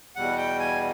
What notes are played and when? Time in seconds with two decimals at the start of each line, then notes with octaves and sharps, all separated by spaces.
0.16 E2 B2 G3 F#5
0.37 G5
0.59 G#5